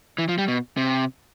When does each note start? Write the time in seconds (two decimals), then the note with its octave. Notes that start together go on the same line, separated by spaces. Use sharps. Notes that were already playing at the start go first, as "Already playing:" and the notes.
0.18 E3
0.29 F3
0.38 G3
0.48 B2
0.77 C3